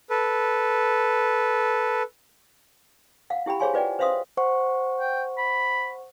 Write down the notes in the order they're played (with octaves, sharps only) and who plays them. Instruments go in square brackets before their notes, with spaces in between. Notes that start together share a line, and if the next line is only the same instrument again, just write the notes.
[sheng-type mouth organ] A4 B4
[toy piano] F5 F#5
E4 G4 G5 B5
G#4 C5 C#5 F5 G#5 C6
F4 B4 D5 F#5 G5
B4 C5 E5 F5 C6 D#6
[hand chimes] C5 F#5 C#6
[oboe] G5
B5